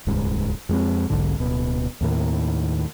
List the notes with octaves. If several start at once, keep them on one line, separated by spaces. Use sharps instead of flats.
D#1 C#2 G#2
F2 G#3 C4
E1 B1 G#2 D3
D1 B2
D#2 A2 D#3